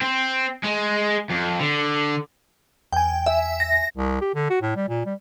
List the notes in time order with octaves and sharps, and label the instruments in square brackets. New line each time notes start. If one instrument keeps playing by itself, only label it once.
[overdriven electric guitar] C4
G#3
F2
D3
[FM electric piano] E2 G#5 [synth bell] G5
[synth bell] E5
A#6
[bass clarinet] C2
G4
D3
F#4
A2
G3
A#2
G3